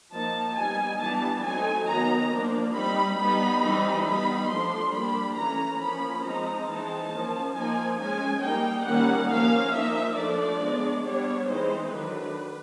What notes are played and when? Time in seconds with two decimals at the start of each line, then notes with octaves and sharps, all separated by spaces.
0.12 F3 A#3 D#4 A5
0.56 G3 B3 D#4 G#5
1.00 E3 G3 B3 D4 A5
1.43 F#3 A3 C4 D#4 G#5
1.87 D#3 F#3 B3 D#4 A#5
2.30 F3 A#3 D4
2.74 G3 C4 D#4 B5
3.18 G3 B3 D#4 B5
3.62 E3 G3 C4 D#4
4.05 G3 B3 D#4 B5
4.48 F3 A3 D4 C6
4.93 G3 A#3 D4 B5
5.36 E3 A3 C#4 A#5
5.80 F3 A#3 C#4 B5
6.23 F3 G#3 C4 D#4 A#5
6.67 E3 G#3 C4 D#4 A5
7.11 F3 A#3 C#4
7.55 F3 A#3 D#4 G#5
7.99 G#3 C#4 G#5
8.41 G3 A#3 D#4 G5
8.85 D#3 G3 A#3 C#4 F#5
9.29 F3 A#3 C#4 F5
9.72 F3 A#3 D#4 E5
10.16 F3 A3 D4 D5
10.61 G#3 B3 D4
11.04 G3 B3 D4 C#5
11.47 E3 G#3 C4 D#4 C5
11.91 D#3 F#3 A3 D4 B4